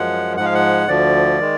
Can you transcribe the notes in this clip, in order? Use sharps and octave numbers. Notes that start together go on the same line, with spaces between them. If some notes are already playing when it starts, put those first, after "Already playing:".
Already playing: F#2 F3 G#3 F#5
G#2 F3 G#3 F#5
F5
F#5
D2 D3 F3 D5
D#3 G#3